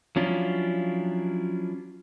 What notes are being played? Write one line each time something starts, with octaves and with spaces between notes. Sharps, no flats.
F3 F#3 C#4 D4 E4 F4